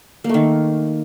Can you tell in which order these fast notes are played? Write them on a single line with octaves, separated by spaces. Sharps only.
A#3 A3 D#3